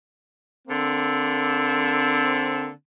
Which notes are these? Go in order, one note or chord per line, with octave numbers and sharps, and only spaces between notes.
D3 A#3 C4